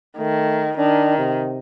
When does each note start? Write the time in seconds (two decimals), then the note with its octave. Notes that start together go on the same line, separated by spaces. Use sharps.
0.18 D#3 A3
0.78 D#3 D4
1.18 C3